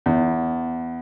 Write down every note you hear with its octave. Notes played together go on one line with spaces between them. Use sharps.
E2